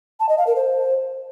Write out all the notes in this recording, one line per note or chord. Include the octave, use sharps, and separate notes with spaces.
A5
D#5
F5
A#4
C5